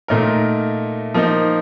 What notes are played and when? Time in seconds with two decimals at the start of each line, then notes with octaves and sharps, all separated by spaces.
0.08 A#2 A3 D#4 A#4
1.14 F3 A#3 D#4